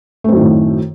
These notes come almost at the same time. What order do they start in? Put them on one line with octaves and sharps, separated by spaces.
A3 C4 F#2 D#3 A2